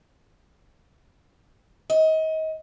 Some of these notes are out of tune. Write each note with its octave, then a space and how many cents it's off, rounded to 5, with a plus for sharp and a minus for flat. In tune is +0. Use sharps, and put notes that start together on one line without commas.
D#5 +30